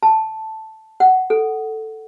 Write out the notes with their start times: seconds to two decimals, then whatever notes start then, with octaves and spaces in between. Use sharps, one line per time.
0.03 A5
1.00 F#5
1.30 A4